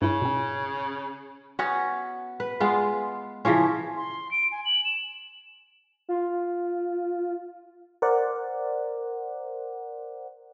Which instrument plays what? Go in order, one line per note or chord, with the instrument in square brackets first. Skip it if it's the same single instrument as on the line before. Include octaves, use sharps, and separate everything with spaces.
[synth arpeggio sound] G2 E4 [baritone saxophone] C#3
[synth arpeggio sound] B2 C#4
[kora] B3 C#4 F#4
B4
G#3 B3 F4
C#3 E3 F3 C#4
[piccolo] C6
D7
G#5
F#7
E7
[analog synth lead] F4
[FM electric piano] A#4 C5 D5 F#5